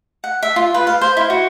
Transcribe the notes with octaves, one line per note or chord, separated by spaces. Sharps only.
F#5
E5
F4
B4
F5
C5
E4
F#4